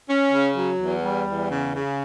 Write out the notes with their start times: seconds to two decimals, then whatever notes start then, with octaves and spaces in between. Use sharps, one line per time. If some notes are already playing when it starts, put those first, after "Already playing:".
0.09 C#4
0.32 C#3
0.56 F#3
0.80 E2
1.04 G3
1.27 E2
1.51 C#3
1.75 C#3